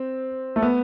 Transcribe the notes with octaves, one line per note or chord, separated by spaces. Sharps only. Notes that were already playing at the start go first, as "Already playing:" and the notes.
Already playing: C4
A3
B3